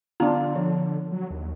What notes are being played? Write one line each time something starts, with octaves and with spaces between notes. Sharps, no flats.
D3 B3 D4 F4 A#5
F3
F#3
D#2